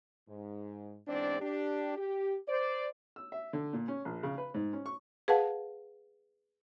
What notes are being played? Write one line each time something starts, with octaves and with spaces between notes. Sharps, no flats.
G#2
E2 G#2 C4 D4 D5
D4 G4
G4
C5 D5
E6
E5
D3
A#2
C#4
A#1
C#3
B4
G#2
C#4
C#6
G#4 B4 F5 F#5 A5